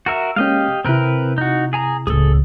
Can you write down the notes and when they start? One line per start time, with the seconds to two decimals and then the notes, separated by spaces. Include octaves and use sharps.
0.06 F#4 A#4 E5
0.36 G#3 A#3 C#4 G4 D#5 F5
0.85 D#2 C3 C4 E4 A#4 B4
1.38 D#4 F#4
1.73 G#4 G#5 A#5
2.07 D1 C#2 G#4 A4